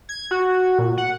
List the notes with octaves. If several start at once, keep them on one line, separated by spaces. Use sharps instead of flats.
G#6
F#4
A#2
F#5